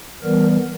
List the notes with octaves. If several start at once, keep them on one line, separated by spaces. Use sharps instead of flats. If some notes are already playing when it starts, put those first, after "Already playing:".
E3 G3 B3 A#4